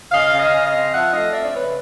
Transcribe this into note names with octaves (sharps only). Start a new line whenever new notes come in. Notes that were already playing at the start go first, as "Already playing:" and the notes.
C#3 D#5 F5
C#3
D#5 F5
C#3
D#5 F5
C4
F3 E5 F#5
A3 D#5 F5
C4 D5 E5
D5
C#3 B4 C#5